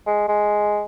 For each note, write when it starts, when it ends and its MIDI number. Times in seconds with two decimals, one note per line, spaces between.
0.07 0.26 56
0.29 0.84 56